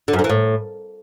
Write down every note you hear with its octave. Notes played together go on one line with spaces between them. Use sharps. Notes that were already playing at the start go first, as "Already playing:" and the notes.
D3
F#2
D3
E3
A2